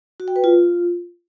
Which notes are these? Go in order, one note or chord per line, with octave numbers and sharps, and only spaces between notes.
F#4
G5
B4
F4